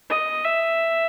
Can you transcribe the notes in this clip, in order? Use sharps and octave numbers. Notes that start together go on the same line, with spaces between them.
D#5
E5